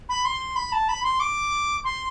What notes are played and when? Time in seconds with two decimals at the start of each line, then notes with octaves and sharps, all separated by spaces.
0.09 B5
0.25 C6
0.56 B5
0.72 A5
0.89 B5
1.04 C6
1.20 D6
1.84 C6